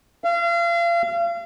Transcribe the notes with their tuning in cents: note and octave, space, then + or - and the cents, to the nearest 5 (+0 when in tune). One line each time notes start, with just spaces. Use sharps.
F5 -35